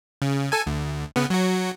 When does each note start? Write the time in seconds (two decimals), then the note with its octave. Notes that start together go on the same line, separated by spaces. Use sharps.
0.22 C#3
0.52 A4 G#5
0.67 D2
1.16 C#3 B3
1.30 F#3 F#4